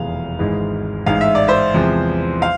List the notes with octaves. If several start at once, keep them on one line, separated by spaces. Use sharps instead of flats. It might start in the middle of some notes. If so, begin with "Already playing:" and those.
Already playing: F1 E2 B2 G#3 F5
G#1 G#2 E3 G#3
A1 G#2 G#3 F5
E5
D5
C5 E5
E2 C3 F3 G#3
F5